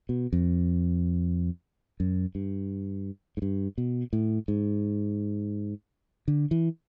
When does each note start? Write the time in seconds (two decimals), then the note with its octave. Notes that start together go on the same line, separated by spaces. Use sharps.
0.09 B2
0.33 F2
2.00 F#2
2.35 G2
3.37 G#2
3.42 G2
3.78 B2
4.13 A2
4.48 G#2
6.28 D3
6.51 E3